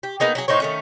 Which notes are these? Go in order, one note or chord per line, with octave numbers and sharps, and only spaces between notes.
G4
A#3 B3 D#4 G#4
F#3 G4 G#4
A2 D#4 C5 C#5
D#3 A3 C#4